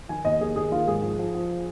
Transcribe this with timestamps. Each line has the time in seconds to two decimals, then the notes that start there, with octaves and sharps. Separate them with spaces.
0.09 D#3 G#5
0.25 D#2 D#5
0.40 D#3 G#4
0.56 D#2 G#4
0.71 D#3 F4
0.87 G#2 G#4
1.03 F3
1.19 F3
1.35 F3